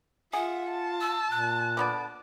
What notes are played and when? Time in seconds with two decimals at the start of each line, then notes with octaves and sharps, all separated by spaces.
0.33 F4 G#4 E5 F#5
0.71 A5
1.01 E6
1.31 A#2 F#6
1.77 D3 B3 D5